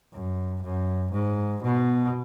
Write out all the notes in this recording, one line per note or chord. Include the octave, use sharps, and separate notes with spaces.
F#2
F#2
G#2
B2